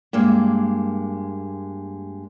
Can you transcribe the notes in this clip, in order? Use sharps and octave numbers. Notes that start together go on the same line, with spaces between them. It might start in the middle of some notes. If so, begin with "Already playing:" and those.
G2 G#3 A#3